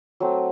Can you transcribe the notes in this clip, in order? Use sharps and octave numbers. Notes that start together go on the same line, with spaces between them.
F#3 A3 C4